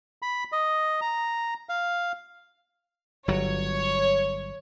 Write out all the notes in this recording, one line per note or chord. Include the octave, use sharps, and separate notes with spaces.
B5
D#5
A#5
F5
G1 F#3 C#5